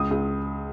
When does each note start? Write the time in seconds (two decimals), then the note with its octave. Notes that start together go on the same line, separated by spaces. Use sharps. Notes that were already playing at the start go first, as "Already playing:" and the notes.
Already playing: C#2 D#6
0.11 C#2